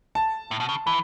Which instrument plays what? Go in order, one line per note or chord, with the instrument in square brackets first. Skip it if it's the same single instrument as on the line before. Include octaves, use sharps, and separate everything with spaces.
[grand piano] A5
[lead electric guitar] A2
B2
C#3
[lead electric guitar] E3 [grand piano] B5